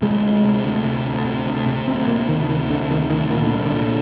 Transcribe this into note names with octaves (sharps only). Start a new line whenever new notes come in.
C3 G#3
D2
C3
D2
C3
D2
C3
D2
C3
D2 C4
C3 A#3
D2 D#3
C3 D#3
D2 D3
C3 D#3
D2 D#3
A#2 D#3
D3
C2
D3
A#2